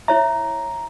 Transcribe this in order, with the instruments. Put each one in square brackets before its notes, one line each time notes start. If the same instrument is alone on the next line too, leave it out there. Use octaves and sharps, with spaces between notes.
[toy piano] E4 C#5 E5 [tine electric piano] A#5